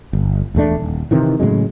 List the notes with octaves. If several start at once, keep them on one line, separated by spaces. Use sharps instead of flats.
G1
E1 E2 A3 D4
D#1
C3 D#3 E3
A2 C#3 F#3 G#3